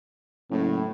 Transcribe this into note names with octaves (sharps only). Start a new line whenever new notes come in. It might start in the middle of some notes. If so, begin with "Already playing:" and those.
F#1 A2